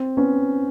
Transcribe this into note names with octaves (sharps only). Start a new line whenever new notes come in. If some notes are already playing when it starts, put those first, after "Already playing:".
Already playing: C4
B3 C#4